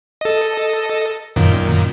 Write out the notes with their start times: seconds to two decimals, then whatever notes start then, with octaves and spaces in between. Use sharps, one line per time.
0.21 A4 D#5
1.36 F#2 A#2 D#3